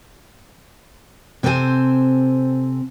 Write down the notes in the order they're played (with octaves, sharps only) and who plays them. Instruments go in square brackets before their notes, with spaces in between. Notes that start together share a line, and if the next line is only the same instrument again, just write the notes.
[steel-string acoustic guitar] C3 C4 A4 B4 C5 G#5